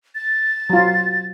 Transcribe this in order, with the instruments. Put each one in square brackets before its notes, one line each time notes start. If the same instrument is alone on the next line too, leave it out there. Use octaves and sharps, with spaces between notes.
[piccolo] A6
[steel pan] F#3 F4